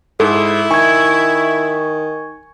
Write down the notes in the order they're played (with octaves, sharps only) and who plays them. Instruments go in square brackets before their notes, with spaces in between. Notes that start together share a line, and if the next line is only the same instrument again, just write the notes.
[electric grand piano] G#2 [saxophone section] E4 [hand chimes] A4
[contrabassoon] D#3 [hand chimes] G#5 G#6 [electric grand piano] C#6